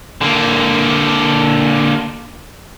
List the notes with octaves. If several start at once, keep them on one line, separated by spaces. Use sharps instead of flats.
D3 A#3